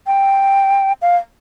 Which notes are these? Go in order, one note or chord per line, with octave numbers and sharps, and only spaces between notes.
G5
F5